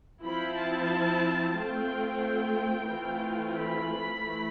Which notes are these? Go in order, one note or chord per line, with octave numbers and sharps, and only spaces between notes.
F3 C4 E4 B5
A5
A3 C4 F4 G5
E3 A3 C4 F4
B5
E3 A3